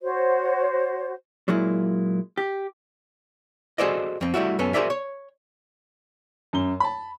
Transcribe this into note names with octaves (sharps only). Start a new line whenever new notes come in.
F#4 C5 C#5
A#2 F#3 G#3 A#3 E4
G4
F#4 G#4 A4 C5 D5 D#5
F2 C4
G3 A3 E4 F#4
F#2 B3 C#4 A4
F#4 G#4 A#4 C5 D5 E5
C#5
F#2 G7
A5 B5